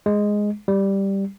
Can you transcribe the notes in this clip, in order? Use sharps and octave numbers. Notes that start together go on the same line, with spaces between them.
G#3
G3